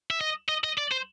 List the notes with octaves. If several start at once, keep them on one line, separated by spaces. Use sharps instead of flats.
E5
D#5
D#5
D#5
D5
C5